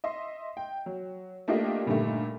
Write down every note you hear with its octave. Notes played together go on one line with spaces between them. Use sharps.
D#5 E5 C6
G5
F#3
A3 A#3 D4 F4 G4 D#5
G2 A#2 D3 D#3 G3 A3